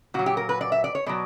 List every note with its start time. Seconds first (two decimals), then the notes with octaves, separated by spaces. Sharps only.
0.14 A#2 F#3 F#4
0.26 G4
0.37 A#4
0.49 B4
0.61 D5
0.72 E5
0.84 D5
0.95 C#5
1.06 B2 F#3 D5